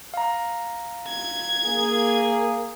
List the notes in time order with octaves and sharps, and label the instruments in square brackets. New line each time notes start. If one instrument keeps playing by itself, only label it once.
[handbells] F5 A#5
[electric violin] G#6
[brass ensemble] A#3 G#4